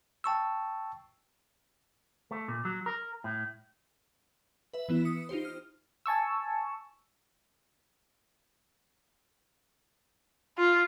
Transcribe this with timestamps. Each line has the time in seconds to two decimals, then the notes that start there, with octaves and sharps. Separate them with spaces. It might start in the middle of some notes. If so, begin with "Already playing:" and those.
0.24 G5 A5 C#6 E6
2.31 A3
2.48 A#2
2.65 F#3
2.86 A#4
3.24 A2
4.74 B4 E5
4.89 E3 B3 E4
5.05 D#6 C#7
5.29 D#4 F4 G4 C5
5.45 F6
6.06 G#5 A5 C#6 E6
10.58 F4